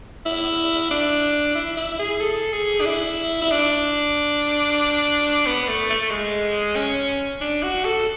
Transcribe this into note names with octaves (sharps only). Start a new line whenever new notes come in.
E4
D4
E4
E4
G#4
A4
G#4
D4
E4
E4
D4
B3
A3
A3
A3
G#3
C#4
D4
F#4
A4